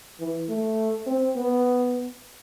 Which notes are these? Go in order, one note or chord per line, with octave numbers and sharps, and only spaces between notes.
E3
A3
C4
B3